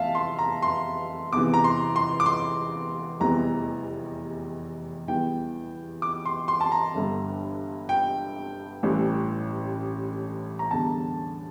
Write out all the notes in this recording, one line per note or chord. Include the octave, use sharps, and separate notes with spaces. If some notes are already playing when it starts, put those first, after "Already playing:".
Already playing: F1 E2 E3 E5 F5 A5
C6
A#5
C6
E2 C3 E3 D6
A#5
C6
C6
D6
C6
F1 E2 C3 E3 G3 A#5
E2 E3 G3 G5
D6
C6
C6
A5
A#5
G1 G2 D3 G3
G5
A1 A2 E3 G3
A#5
E2 D3 G3 A5